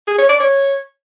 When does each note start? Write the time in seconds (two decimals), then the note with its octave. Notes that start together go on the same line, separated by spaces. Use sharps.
0.08 G#4
0.18 C#5
0.29 D5
0.40 C#5